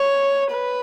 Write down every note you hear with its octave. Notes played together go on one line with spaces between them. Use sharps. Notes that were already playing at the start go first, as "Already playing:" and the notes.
Already playing: C#5
B4